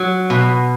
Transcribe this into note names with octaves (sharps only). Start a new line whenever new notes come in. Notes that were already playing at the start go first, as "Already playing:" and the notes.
Already playing: F#3
B2